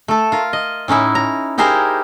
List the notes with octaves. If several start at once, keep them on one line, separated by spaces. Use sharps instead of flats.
A3 A4
F4 A#4
D#5
A2 C#4 D#4 E4
A#5
D#4 E4 G4 G#4 A#4 C5